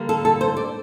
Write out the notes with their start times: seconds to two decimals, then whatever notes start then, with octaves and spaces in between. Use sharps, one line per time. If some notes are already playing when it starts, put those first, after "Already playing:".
Already playing: D3 G3 A#3
0.09 A4
0.25 A4
0.41 C5
0.57 D5